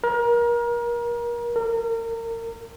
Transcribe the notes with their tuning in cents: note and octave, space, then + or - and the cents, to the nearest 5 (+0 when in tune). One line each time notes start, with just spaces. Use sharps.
A#4 +30
A#4 -30